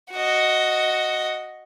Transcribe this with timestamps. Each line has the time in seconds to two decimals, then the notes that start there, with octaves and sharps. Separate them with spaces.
0.12 F#4 D#5